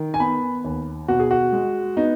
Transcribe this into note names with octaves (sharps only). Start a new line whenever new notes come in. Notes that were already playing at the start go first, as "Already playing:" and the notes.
Already playing: D#3
G#5
B3 B5
D#2
B2 F#4
G#4
F#4
G#3
B3 D#4